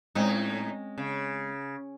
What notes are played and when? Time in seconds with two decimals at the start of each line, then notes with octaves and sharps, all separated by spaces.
0.15 A2 G#3 C4 C#4 D#4
0.98 C#3